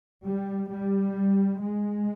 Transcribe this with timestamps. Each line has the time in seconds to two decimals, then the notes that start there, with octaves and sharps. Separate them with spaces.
0.25 G3
0.70 G3
1.60 G#3